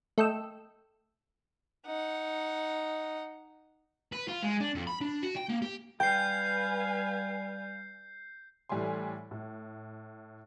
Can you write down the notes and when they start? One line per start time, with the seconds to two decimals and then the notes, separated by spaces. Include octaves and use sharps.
0.18 A3 A4 D#5 G5 E6
1.86 D#4 F#5
4.12 B4
4.28 F4
4.43 G#3
4.60 D4
4.75 F2
4.87 B5
5.01 D4
5.23 F#4
5.37 G5
5.50 A#3
5.62 G4
6.00 G3 B4 F5 G5 G#5 G6 C7
8.69 A2 E3 G3 A3 G#5 C6
9.31 A2